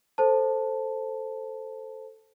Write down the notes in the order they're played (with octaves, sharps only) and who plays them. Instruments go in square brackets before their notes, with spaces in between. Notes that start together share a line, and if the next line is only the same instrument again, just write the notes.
[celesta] A4 C5 A5